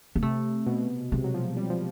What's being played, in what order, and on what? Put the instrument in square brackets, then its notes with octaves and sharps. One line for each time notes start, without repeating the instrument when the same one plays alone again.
[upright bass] A#3
[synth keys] C3 [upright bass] A3
[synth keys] B2
[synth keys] C3 [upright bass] G#3
[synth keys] F#3
F3
G3
F3